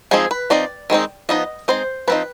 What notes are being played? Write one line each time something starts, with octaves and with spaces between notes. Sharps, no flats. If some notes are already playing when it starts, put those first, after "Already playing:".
F3 G#3 C4 D#4 G#4
B4
F3 C4 D#4 D5
D#3 G#3 C4 D#4
F3 B3 D#4 D#5
G#3 C4 D#4 C5
F3 C4 D#4 B4